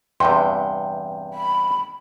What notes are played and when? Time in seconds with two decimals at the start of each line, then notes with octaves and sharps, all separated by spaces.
0.20 E2 G2 C3 G5 C6
1.33 B5